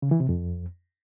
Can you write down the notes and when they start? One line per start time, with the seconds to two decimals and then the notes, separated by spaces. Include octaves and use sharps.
0.02 C#3
0.11 E3
0.20 C3
0.29 F2